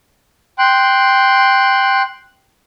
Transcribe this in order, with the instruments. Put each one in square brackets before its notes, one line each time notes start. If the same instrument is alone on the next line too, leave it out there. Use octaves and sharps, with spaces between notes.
[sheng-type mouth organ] G5 C6 F#6